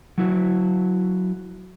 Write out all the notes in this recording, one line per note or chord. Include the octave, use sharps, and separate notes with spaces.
F#3 E4 F#4